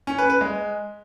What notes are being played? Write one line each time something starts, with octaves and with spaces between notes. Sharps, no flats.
C#4
B4
B4
G#3